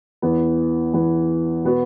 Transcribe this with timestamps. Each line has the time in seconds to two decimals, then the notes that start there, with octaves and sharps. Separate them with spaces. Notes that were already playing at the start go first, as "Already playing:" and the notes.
0.22 E2 E3 B3
0.93 E2 E3 B3
1.64 B2 B3 F#4 B4